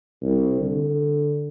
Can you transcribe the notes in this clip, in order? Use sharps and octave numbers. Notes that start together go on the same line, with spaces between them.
C2
D3